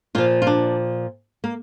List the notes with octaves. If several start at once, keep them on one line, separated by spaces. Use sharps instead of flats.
A#2 F3 F4
F4
D4
A#3